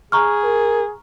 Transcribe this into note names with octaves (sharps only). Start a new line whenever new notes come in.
G#4 A#5 C#6 F6
A#4